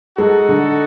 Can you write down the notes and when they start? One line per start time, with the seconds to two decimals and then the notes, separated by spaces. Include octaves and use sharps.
0.18 G#3 D#4 F#4 A4
0.49 D3